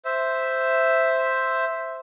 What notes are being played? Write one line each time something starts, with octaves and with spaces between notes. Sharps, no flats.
C5 E5